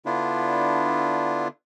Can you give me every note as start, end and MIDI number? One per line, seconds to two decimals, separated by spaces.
0.06 1.48 50
0.06 1.48 59
0.06 1.48 62
0.06 1.48 64
0.06 1.48 65